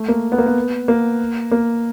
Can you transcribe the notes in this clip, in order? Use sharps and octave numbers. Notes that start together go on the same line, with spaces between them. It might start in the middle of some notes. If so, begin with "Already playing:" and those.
Already playing: A3
A#3
B3
A#3
B3
A#3
A#3